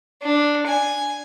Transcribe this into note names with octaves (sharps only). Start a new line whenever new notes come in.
D4
G#5